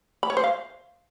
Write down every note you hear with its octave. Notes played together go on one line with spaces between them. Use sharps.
B5
C#5
C5
F5